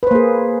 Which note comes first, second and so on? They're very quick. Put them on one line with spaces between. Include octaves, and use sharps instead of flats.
B4 C5 A#3 G#4